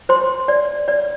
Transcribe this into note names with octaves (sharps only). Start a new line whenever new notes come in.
C5 C6
D5
D5